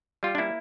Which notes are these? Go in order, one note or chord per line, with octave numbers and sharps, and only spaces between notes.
G3 F4
D4
A#3 E4